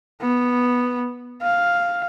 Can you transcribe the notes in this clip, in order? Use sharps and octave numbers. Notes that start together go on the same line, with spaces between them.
B3
F5